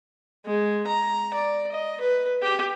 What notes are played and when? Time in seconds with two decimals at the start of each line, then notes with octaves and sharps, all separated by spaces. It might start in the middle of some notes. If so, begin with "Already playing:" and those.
0.45 G#3
0.87 A#5
1.34 D5
1.72 D#5
2.01 B4
2.42 G4